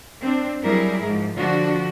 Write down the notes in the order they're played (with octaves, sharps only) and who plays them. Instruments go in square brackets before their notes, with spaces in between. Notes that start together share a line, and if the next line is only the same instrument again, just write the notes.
[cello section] C4 D4
F#3 G3 E4 G#4 A#4
G#2 F3
D3 F3 D4 F#4